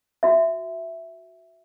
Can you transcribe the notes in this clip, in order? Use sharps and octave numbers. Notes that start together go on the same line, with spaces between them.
F#4 E5